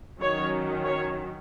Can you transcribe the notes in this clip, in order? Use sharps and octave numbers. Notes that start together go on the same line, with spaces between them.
D#3 F#3 C#4 C#5
C#5